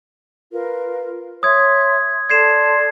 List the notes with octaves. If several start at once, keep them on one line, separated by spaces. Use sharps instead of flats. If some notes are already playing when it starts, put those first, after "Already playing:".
F4 A#4 B4
C#5 E5 C6 D#6 G#6
A4 D5 C6 G#6 C7 E7